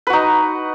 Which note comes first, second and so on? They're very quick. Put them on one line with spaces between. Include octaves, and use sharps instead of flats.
B4 F#4 D#4